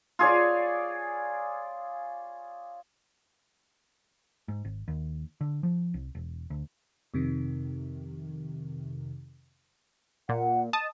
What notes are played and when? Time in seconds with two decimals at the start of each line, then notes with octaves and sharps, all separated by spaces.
0.19 F4 G#4 C#5 D5
4.48 G#2
4.65 G#1
4.88 D#2
5.41 D3
5.63 F3
5.94 C2
6.15 E1
6.50 D2
7.14 F2 C3 D#3
10.29 A#2 F#5
10.73 D#5 A5 D#6